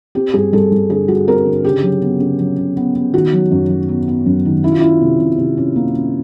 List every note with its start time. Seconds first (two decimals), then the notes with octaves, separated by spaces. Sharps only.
0.15 C4 G4
0.34 G2 G#4
0.53 G2 A4
0.71 G2
0.90 D3 G#4
1.08 G3 F#4
1.27 C4 A#4
1.46 D3
1.64 C#3 G4
1.83 F#3
2.01 B3
2.20 C#3
2.40 F#3
2.58 C#3
2.77 B3
2.95 B3
3.14 D#3 F#4
3.33 F#3
3.51 F#2
3.70 F#3
3.89 B3
4.08 B3
4.26 F#2
4.45 D#3
4.63 C#4 E4
4.72 F4
4.80 C#4 E4
5.01 C3
5.19 C3
5.38 C3
5.57 C#4
5.76 A#3
5.95 C#4